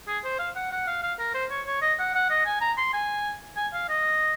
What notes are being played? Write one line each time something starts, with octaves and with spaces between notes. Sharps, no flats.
G#4
C5
F5
F#5
F#5
F5
F5
A#4
C5
C#5
C#5
D#5
F#5
F#5
D#5
G#5
A#5
C6
G#5
G#5
F5
D#5